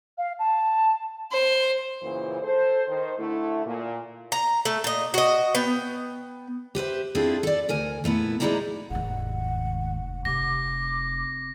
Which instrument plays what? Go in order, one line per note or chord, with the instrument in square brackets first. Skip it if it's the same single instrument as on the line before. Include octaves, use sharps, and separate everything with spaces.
[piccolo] F5
A5
[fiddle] C5
[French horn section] F#2 A#2 C#3 E3 C5
A4 C5
D#3 C5
D3 A3 E4
A#2
[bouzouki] A#5
A3
A#2 D#5
F#4 D#5
B3 G5
[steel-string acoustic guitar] G4 B4 C5 E5
C4 D4 E4 F4 G#4 A4
A4 D5
D2 A#4 G#5
A#2 A3 B3 E4
F2 G#3 D#4 E4 D5 A#5
[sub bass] F1 [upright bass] D#2 G#2 [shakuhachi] F#5
[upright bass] C3 [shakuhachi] D6 [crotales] A#6